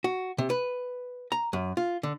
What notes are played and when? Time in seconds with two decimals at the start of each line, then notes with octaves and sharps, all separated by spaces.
0.04 F#4
0.38 C3
0.50 B4
1.32 A#5
1.53 F#2
1.77 F4
2.03 D3